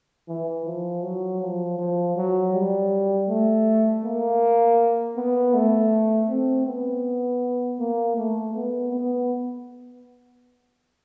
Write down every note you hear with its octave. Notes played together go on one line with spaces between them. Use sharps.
E3
F3
F#3
F3
F3
F#3
G3
A3
A#3
B3
A3
C4
B3
A#3
A3
B3
B3